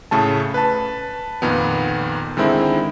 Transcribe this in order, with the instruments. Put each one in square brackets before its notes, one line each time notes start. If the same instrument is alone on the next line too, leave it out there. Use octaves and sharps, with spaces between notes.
[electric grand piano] A2 C#3 A3 A5
B4 A5
F2 A#2 D#3 B3
D3 D#3 G#3 C4 E4